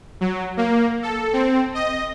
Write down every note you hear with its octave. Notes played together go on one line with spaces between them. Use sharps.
F#3
A#3
A4
C4
D#5